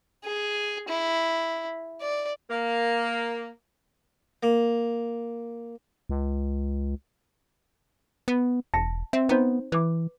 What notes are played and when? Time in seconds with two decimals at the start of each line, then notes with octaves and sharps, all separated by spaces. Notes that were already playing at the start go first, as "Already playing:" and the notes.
0.25 G#4
0.88 E4
2.01 D5
2.49 A#3
4.43 A#3
6.09 C#2
8.28 B3
8.74 E1 A5 A#6 C#7
9.13 C4 E5
9.29 B3 C4 D#4 C5
9.72 E3 B4 D6